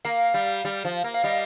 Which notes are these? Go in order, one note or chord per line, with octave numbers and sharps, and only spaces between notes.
A#3 F5
G3
G3
F3
A#3
F5
G3 D#5